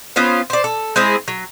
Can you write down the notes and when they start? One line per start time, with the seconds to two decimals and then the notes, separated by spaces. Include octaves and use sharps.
0.16 B3 C#4 F4 C5
0.50 C5 D5
0.64 A4
0.96 G#3 C4 E4 G#4
1.28 F#3